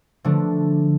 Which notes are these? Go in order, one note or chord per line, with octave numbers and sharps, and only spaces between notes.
D3 F3 A3 D4